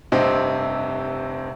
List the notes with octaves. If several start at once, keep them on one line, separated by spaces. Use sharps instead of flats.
F1 G2 C3 C4 D#5